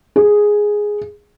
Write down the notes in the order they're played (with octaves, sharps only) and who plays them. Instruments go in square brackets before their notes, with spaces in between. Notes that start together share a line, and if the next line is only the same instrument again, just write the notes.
[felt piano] G#4